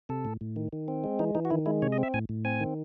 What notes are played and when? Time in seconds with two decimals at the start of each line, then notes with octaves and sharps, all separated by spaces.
0.09 C3 A4
0.25 A2
0.41 A2
0.56 D#3
0.73 D#3
0.88 C4
1.04 G#3
1.19 E3 D#4
1.35 E3 D#4
1.45 F#4
1.50 D#3 E4
1.66 G#3 E4
1.82 C3 C#5
1.92 D#5
1.98 C4 E5
2.14 A2 G#5
2.29 A2
2.45 C4 G#5
2.60 D#3